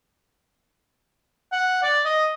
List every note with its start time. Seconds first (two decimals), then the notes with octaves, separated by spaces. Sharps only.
1.52 F#5
1.83 D5
2.05 D#5